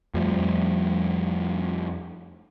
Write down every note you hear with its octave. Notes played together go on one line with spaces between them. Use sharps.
F2 F3 G3 A3